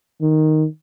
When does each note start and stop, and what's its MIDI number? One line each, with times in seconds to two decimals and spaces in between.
0.21 0.66 51